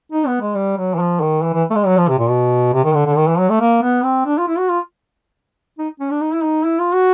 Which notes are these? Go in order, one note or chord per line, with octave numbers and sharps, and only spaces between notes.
D#4
B3
G#3
G3
F#3
E3
F3
D#3
E3
E3
A3
G#3
F#3
F3
C3
A#2
B2
C3
D#3
D3
D3
D#3
E3
F#3
A3
A#3
B3
C4
D4
F4
E4
F#4
F4
D#4
C#4
D4
D#4
E4
D#4
E4
F4
F#4